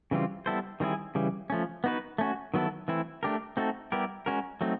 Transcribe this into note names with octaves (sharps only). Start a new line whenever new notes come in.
C#3 E3 G3 C4 F4
G3 B3 E4 A4 C5
D#3 G3 C4 E4 G#4
C#3 E3 G3
F3 A3 C#4
B3 D#4 F#4 B4
A3 C#4 F#4
D#3 F#3 B3 E4 A4
E3 A3 C4 E4
A3 D4 G4 A#4
A3 C4 D#4 F#4 A4
G3 B3 E4 G4 A#4
G#3 C#4 F#4 A#4
F#3 A3 C4 D#4